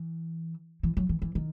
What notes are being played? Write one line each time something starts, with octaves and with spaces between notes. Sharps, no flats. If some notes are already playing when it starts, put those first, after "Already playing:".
Already playing: E3
E3
F#3
E3
E3
D#3